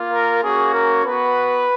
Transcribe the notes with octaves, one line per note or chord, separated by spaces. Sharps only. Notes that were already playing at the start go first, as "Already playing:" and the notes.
Already playing: A#3 F4
A#4
A#3 C#4 F#4 G#4
A#4
B3 F#4 B4